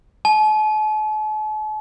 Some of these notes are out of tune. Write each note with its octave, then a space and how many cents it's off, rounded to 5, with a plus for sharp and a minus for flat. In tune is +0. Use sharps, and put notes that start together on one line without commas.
A5 -45